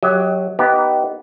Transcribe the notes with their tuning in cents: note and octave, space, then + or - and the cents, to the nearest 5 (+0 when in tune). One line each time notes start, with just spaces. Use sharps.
F#3 +0 G4 +5 D#5 +40
B3 +0 D#4 +0 G4 -20